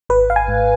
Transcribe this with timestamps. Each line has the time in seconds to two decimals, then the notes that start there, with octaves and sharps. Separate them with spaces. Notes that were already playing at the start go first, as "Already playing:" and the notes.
0.09 G#1 B4
0.30 F5
0.36 G#5
0.48 G#2